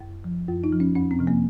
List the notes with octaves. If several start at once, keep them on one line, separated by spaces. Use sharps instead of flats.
F#2
F3
F#2 F4
D#4
F3
C#4
F2 C#4
C4
C3 F3
A#3